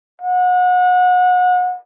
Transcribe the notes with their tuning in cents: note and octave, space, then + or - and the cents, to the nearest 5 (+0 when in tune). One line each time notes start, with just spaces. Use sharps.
F#5 -30